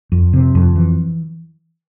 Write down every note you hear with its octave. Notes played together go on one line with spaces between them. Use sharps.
F2
C3
F2
E3